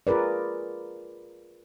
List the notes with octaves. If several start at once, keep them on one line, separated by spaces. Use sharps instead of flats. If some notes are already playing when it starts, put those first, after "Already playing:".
F4 G#4 A#4 B4 D5